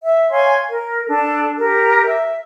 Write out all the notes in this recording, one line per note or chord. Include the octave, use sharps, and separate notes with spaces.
E5
C#5 F5 G#5 C6
A#4
D4 A4
G4 A#4
E5